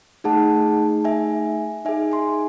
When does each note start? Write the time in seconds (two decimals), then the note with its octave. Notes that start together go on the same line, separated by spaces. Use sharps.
0.24 A3 D#4 G#4 F#5 A5
1.05 E5 G#5
1.85 D#4 G#4 E5 G#5
2.12 G#5 C6